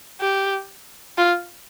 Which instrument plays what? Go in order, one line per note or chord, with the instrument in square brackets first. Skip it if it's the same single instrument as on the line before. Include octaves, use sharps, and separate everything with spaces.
[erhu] G4
F4